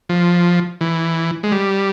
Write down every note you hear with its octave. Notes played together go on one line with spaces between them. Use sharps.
F3
E3
G#3
G3